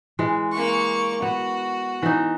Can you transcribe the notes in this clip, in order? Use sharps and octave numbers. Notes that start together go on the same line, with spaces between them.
E3 G#3
A#3 C#6
B3 F#4
E3 D#4